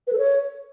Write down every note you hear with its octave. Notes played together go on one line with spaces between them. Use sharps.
B4
A4
C#5